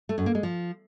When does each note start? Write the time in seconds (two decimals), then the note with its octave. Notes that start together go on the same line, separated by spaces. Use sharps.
0.09 A3
0.18 F#2
0.26 A#3
0.35 G#3
0.43 F3